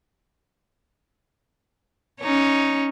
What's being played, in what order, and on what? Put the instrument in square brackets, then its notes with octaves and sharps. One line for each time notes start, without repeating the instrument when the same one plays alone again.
[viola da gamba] C#4 D#4 C#5